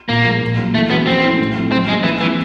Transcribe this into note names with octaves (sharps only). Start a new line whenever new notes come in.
A#2 A#3
F3 G#3
A#2
F#3 A#3
E3 A3
G#3 B3 C#4 F#4
F3 C4
A3 C#4 E4
A2
F3 A3 C4 E4
F#3 C4
G#3 A#3 C#4
E3 F3
E3 G#3 C4